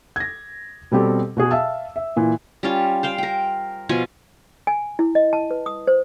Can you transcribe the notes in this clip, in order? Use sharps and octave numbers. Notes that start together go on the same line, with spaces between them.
G#6 A#6
B2 G3 C4 G4 A4
B2 F#4 G#4
E5 F5 A5 E6
E5
A#2 E3
G3 C#4 F4
C5 F5 G5
A#4 G5
B2 F3 F4 G#5
G#5
E4
D#5
A5
B4
D#6
C5